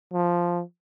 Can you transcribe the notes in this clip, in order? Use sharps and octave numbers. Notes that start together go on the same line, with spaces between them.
F3